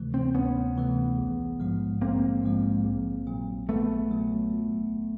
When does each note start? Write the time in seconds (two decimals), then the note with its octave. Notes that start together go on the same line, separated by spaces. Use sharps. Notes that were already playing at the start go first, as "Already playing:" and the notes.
Already playing: D2 C3 E3 A3
0.13 A#3 C4
0.35 D2 B3 C#4
0.76 C3 E3 A3
1.18 A#1
1.60 G#2 F3 G#3
2.02 A#1 A#3 C4
2.43 G#2 F3 G#3
2.85 A#1
3.27 A#2 F#3
3.69 A#1 A3 B3
4.11 A#2 F#3
4.53 G1